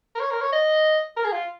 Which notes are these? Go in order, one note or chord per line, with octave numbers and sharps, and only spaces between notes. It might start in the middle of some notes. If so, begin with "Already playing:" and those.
A#4
C#5
A#4
C#5
D#5
A#4
G#4
F4